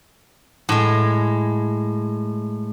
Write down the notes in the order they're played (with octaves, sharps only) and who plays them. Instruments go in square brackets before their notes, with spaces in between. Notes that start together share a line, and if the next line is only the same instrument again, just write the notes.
[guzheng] A2 G#3